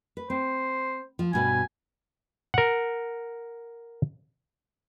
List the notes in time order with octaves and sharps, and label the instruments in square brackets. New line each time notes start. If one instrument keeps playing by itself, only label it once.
[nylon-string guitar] B4
[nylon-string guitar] C4 [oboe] C5
[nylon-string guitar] F3
[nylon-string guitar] G2 B2 B4 [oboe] G#5
[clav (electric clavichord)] A#4 F#5